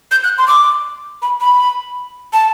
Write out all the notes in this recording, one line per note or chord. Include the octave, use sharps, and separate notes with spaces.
G6
F#6
C6
D6
B5
B5
A5